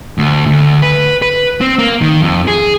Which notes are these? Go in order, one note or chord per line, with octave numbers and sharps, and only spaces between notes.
D2
D2
B4
B4
C4
A#3
D#3
F2
G#4